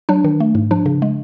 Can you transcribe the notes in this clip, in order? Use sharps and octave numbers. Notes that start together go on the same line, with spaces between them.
F#3 D4
D#3
A3
G#2
F3 D4
C#3
G#3